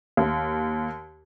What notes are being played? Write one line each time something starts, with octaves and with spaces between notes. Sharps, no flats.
D#2